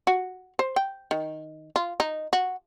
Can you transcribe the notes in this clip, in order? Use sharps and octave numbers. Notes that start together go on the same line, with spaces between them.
F#4
C5
G5
D#3
F4
D#4
F#4